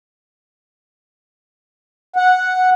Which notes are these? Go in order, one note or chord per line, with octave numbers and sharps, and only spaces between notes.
F#5